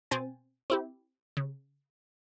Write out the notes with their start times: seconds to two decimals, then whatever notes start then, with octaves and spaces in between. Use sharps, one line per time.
0.11 B2 C4 C5 G#5 A6
0.70 C4 E4 G4
1.37 C#3